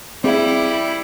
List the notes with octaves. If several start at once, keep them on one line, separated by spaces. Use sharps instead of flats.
G3 C4 E4 G#4 F5